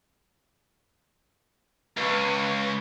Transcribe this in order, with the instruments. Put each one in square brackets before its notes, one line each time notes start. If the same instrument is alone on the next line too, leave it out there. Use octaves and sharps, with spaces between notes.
[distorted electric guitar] C#2 [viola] B4 C#6